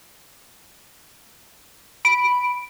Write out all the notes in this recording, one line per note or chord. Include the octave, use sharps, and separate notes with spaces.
B5 D7